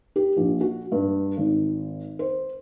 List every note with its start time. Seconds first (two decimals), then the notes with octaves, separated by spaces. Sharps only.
0.16 G4
0.36 A#1
0.61 F#4
0.92 G2
1.37 G#1
2.19 C5